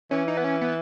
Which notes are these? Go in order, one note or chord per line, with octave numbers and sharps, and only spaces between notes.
E3 C#4
D#4
B3
C#4
B3